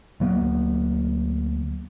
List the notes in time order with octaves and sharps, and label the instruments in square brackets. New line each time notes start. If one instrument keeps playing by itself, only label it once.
[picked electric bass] D2 F#3 A#3 B3